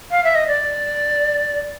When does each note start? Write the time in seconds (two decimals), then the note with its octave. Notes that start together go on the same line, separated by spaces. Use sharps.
0.11 F5
0.24 E5
0.35 D#5
0.47 D5